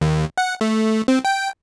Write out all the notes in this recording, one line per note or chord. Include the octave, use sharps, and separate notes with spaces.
D#2
F#5
A3
C4
G5